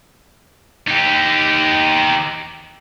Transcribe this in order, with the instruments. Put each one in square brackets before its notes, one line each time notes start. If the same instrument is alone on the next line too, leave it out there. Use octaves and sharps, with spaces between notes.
[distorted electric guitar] D#4 G4